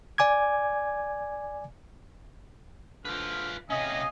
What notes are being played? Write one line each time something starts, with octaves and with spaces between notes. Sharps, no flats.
D5 G#5 D6 G#6
D3 F3 F4 B4 F6
C3 C#4 D#5 F5 G#5